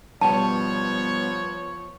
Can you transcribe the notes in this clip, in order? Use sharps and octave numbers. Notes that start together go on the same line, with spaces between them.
G2 B2 F3 B3 C#5 A5